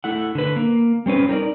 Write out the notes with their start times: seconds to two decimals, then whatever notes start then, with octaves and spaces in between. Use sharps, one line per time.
0.04 A3 E4 F#5
0.35 D3 B4
0.56 A#3
1.06 G3 C4 C#4 B4
1.29 D#4 A#4 D5